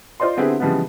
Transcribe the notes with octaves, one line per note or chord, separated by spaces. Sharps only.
F4 C5 D5 D#5 C6
D3 B3 C4 E4 G4 G#4
C#3 E3 F3 G3 G#3 B3